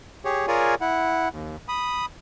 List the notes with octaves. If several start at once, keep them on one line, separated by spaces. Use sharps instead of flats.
G4 G#4 C#5
F4 G#4 A#4 C#5 D5 G#5
E4 F#5
D#2
B5 D#6